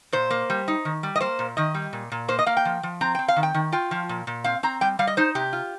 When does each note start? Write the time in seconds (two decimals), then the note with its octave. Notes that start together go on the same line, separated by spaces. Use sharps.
0.13 A#2 C5
0.31 A#3
0.50 G3
0.68 D#4
0.85 D#3
1.03 G3
1.16 D#5
1.20 A#3 C5
1.39 A#2
1.57 D#3 D#5
1.74 G3
1.93 A#2
2.12 A#2
2.28 A#3 C5
2.39 D#5
2.46 A#3 F5
2.57 G5
2.65 F3
2.83 F3
3.01 C4 A#5
3.15 C4 G5
3.28 F5
3.36 D#3
3.43 G5
3.54 D#3
3.72 F4 G5
3.91 F3
4.09 A#2
4.27 A#2
4.44 C4 F5
4.63 C4 A#5
4.81 G3 G5
4.99 G3 F5
5.07 D#5
5.17 D#4 C5
5.35 C3 G4
5.53 F4